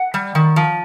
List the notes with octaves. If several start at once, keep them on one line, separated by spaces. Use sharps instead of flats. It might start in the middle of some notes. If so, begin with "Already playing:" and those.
Already playing: F#5
G3
D#3
F3